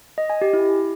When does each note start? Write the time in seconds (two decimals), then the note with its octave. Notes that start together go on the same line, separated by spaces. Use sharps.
0.18 D#5
0.30 G#5
0.41 G4
0.53 E4